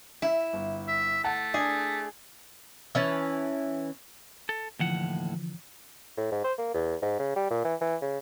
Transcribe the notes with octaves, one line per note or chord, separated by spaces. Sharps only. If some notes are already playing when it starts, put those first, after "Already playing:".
E4 E5
G1
E5
A3 F#5 A5
D4 G#4
E3 C#4 A5
A4
D#2 A2 D3 E3 F3 F#5
A2
G#2
C5
A#3
E2
G#2
C#3
G3
A#2
E3
E3
C#3